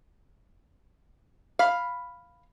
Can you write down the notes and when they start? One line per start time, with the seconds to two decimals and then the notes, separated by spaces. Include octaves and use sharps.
1.59 F5 B5